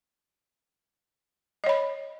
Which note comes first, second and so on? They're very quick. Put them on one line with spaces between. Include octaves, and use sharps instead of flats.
D#5 C#5 B5